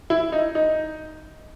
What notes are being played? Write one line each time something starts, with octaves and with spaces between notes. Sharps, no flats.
E4
D#4
D#4